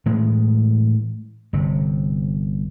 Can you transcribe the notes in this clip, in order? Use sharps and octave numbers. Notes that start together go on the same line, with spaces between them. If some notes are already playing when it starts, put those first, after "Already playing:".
A2 E3 G#3
G1 C3